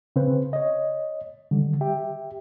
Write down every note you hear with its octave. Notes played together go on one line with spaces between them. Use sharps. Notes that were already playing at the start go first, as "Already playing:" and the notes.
C#3 C4 B4 C5
C#5 D#5
D3 D#3 G3
G4 E5 G5